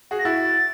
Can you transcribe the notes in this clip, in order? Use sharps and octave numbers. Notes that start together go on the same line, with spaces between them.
F#4 G#4
A#6
E4 F#4 A6